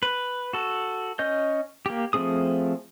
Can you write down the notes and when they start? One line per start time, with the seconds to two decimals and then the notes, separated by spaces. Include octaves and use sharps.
0.03 B4
0.53 F#4 A4
1.19 C#4 D#5 G6
1.86 A#3 G4
2.13 F3 A3 C4 G#4 D#6